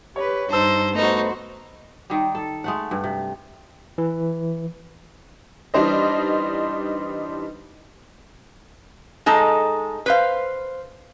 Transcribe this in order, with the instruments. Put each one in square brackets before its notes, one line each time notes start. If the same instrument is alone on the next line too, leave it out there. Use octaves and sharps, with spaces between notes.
[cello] G4 B4 [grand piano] C#5
[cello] G2 D#4 [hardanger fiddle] C5 [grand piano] A5 E6
[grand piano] A3 B3 [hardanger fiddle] D#4 [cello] F#4 C5
[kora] D#3 G3
A4
G#3 A3 F#5
G2
C3
[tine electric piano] E3
[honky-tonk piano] E3 G3 D4 D#4 C5 D#5
[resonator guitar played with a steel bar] G#3 D#4 A4
B4 C5 F5